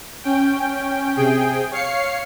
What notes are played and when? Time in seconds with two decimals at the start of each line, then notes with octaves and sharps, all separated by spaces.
0.24 C#4 G5
1.16 C3 G#4 G5
1.72 C#5 F5 C7 C#7